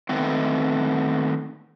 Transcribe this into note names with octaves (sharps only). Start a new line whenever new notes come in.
D#3 F#3 A3 B3 C4